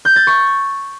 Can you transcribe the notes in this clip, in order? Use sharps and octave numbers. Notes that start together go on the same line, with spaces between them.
G6
A6
C#6